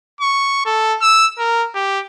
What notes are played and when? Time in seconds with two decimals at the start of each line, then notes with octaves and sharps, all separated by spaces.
0.21 C#6
0.65 A4
1.01 E6
1.38 A#4
1.75 G4